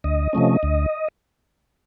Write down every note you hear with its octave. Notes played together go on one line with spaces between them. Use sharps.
D2 D#5
C3 F3 A3 C#4
D2